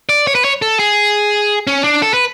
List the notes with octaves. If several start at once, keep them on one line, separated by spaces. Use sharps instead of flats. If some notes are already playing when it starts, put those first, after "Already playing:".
D5
C#5
B4
C#5
A4
G#4
C#4
D4
A4
B4